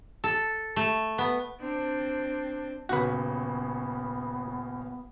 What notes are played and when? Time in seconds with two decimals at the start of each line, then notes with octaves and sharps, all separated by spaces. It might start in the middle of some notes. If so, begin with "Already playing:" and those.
0.24 A4
0.76 A3
1.18 B3
1.60 C4 D4
2.89 D#1 C#3 B3 F#4 B4 C#6